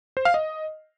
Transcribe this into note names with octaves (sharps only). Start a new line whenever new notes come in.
C5
F5
D#5